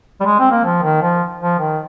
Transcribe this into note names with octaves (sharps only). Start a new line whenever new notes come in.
G3
G#3
C4
A#3
F3
D#3
F3
F3
D#3